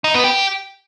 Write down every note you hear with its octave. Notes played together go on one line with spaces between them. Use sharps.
D#4
B3
G4